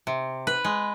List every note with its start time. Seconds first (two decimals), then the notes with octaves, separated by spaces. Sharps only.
0.07 C3
0.47 B4
0.64 G#3